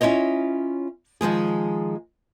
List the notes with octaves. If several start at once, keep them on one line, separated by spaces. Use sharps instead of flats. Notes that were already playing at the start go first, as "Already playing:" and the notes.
C#4 E4 F4 C#5 D#5
D#3 F3 G#3 G#4